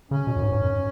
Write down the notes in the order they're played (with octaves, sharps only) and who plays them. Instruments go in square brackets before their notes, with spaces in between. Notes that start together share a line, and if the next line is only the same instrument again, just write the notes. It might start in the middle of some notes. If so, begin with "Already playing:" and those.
[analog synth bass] C#3 [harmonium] C#4
[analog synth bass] B2
F#2
G#2
G#2
F#2